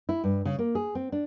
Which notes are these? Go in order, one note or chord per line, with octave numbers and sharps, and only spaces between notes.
E4
G2
C#3
A#3
G#4
C4
D4